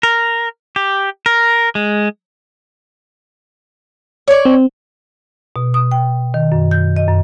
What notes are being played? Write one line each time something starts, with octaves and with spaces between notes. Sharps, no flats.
A#4
G4
A#4
G#3
C#5 D5
C4
B2
D#6
G5
D#3
F#2
G6
D#5
F#2